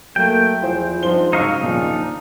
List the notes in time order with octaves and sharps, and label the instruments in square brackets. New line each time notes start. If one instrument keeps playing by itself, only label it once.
[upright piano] F#3 [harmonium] A3 [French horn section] A#3 [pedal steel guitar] G5
[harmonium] E2 [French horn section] F3 E4 [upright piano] F4 G#4 C5
[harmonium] G#2 C4 D4 [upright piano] F3 C6 G7 [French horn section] C5
[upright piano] G#2 E6 [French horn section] C#3 [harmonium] F#3 [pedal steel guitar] D#4 F5 C#6
[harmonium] D#2 D4 [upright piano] A#2 F3